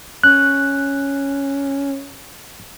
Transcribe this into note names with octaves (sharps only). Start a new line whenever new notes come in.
C#4 F#6